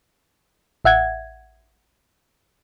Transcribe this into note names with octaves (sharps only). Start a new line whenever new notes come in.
A1 E5 F#5 G#6